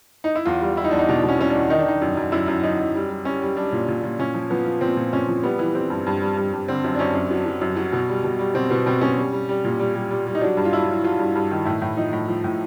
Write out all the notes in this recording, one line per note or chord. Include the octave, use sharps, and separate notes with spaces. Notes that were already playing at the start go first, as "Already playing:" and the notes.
D#4
E4
E2 F4
G3
G3 E4
D#4
E2 D4
D#4
B2 D4
B2
C#4
B2 C#4
D4
E2
D#3 D#4
D4
D#3 D#4
F#2
F#2
F#2 E4
F#2
F#2 D#4
F#2
G3
G3
G3 C#4
G3
G3 D4
A#2
A#2
A#2
A#2 C#4
F3
F3 B3
F3
A#2 C4
A#2
A#2 C#4
F3
G3 B3
E3
G3 C4
G2
G2
G3
G2
G2
D3 C4
F#2
D4
F#2 C#4
F#2
F#3
F#3
F#2
F#3
B2
G3
B2
G3
B2 C4
B2 B3
B2 C4
B2 C#4
G3
G3
G3
A#2
G3
G3
G3
G3
D#4
F#3 D4
G2
F4
F#3 E4
F#3
F#3 F4
G2
G2
D#3
A2 E4
A2
F3 D#4
A2
F3
A2